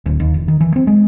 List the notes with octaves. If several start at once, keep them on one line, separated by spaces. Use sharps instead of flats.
D1
D#2
E1
D#3
E3
C4
G#3